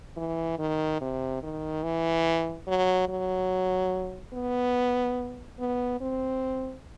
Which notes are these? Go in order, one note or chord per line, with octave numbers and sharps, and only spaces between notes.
E3
D#3
C3
D#3
E3
F#3
F#3
B3
B3
C4